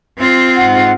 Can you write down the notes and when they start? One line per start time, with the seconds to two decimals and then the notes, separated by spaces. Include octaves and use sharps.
0.18 C4 F4
0.57 G#2 F#5